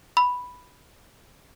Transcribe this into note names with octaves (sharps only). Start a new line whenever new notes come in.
B5